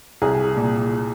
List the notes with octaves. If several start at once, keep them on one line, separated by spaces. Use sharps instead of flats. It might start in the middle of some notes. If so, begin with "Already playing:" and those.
C2 G#4
A#2